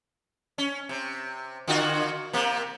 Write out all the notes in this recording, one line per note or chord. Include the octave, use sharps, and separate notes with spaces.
C#4
C3
D3 F4 F#4
C3 A#3